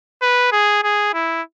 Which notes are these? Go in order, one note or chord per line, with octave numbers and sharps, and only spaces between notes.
B4
G#4
G#4
E4